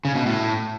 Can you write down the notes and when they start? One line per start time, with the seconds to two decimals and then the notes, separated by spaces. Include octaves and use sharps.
0.05 C#3
0.15 B2
0.26 A2